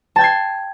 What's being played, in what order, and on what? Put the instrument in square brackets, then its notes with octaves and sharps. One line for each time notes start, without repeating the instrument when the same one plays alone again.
[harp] A5
G5
G#6
C7